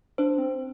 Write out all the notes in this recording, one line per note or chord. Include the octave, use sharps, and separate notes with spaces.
D4 C5
C4